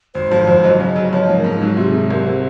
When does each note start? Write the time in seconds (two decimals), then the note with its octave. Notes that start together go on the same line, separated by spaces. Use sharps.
0.15 G#1 C5
0.31 F3
0.47 G#1
0.64 F#3 D#5
0.80 C#3
0.96 F#3
1.12 F3 C#5
1.29 G#2
1.37 A#4
1.44 G#2
1.53 C#4
1.62 F#3 D#4
1.70 F4
1.77 C3 F#4
1.85 G#4
1.94 C3
2.10 C2 A#4
2.26 C3 C5